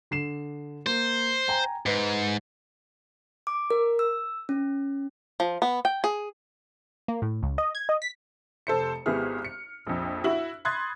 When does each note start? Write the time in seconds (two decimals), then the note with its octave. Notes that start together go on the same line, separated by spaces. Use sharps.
0.11 D3 C7 E7
0.87 A#3 C5
1.48 G5 G#5 A#5
1.86 G#2 B4
3.47 D6
3.71 A#4
3.99 E6
4.49 C#4
5.40 F3
5.62 B3
5.85 G5
6.04 G#4
7.08 A#3
7.22 A2
7.43 C#2
7.58 D#5
7.75 G#6
7.89 D#5
8.02 B6
8.67 F1 A4 C5 C#7
9.06 G#1 B3 E4 G4 G#4 F6
9.45 C#7
9.87 A#1 F2
10.24 E4 F#4 F#7
10.65 B5 C6 D#6 F#6 G#6 A6